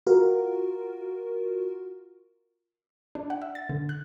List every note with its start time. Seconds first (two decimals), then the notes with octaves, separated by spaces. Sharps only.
0.07 F4 F#4 A#4
3.15 D4
3.30 F#5
3.42 E5
3.55 A6
3.69 D3
3.89 F#6